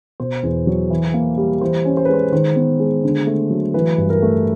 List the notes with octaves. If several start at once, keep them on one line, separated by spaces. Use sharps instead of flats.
B2 C5
E2
F#3
E3
A#3
G3
E3 C5
C#4
C5
B4
G#3 C5
D#3 C5
B3
G#3
D3
A3
F#3
E3 B4
G2
A#4
A3